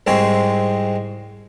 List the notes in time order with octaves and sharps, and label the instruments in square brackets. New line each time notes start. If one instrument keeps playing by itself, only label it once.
[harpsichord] C2 G#2 G#3 C4 C#5